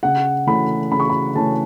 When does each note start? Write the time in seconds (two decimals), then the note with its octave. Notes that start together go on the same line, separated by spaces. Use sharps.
0.03 C#3 F#5
0.47 E3 A3 C#4 B5
0.92 C#3 B5
1.00 C#6
1.10 B5
1.35 E3 A3 C#4 A5